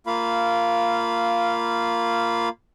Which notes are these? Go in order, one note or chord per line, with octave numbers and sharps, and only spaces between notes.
A#3 F4 F5 B5